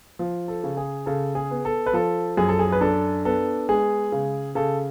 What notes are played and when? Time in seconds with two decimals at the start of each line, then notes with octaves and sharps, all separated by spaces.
0.19 F3
0.48 A4
0.64 C#3
0.77 G#4
1.06 C#3 A4
1.35 G#4
1.51 B3
1.65 A4
1.86 B4
1.93 F3 A4
2.37 F#2 G#4
2.49 A4
2.59 G#4
2.72 B4
2.81 D4 A4
3.25 B3 A4
3.69 G#3 G#4
4.12 C#3
4.55 C#3 A4